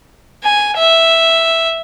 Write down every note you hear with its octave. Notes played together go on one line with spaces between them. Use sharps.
G#5
E5